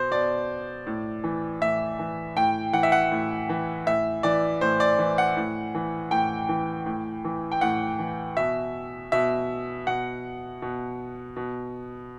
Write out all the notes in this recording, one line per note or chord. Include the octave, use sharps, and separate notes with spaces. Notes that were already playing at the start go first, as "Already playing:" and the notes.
Already playing: B2 C5
B2 D5
A2
E3
A2 E5
E3
A2 G5
E3 F#5
E5
F#5
A2
E3
A2 E5
E3 D5
A2 C5
D5
E3
F#5
A2
E3
A2 G5
E3
A2
E3
G5
A2 F#5
E3
B2 E5
B2 E5
B2 F#5
B2
B2